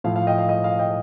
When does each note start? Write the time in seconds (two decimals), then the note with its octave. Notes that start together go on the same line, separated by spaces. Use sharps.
0.04 A2 F3 F5
0.16 F5
0.27 D#5 G5
0.38 F5
0.49 D#5
0.64 F5
0.79 D#5 G5